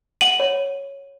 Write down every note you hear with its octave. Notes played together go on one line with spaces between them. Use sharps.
F#5 D#7 F#7
C#5